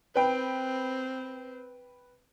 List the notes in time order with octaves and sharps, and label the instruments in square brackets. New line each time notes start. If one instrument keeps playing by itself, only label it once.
[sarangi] C4 [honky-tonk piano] B4 G5